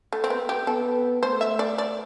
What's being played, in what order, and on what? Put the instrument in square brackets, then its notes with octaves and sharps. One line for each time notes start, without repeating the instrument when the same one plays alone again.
[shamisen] A3
C4
B3
G4
[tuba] B3 [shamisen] A4
[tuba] A3 [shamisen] C5
[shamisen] E5
D5
D5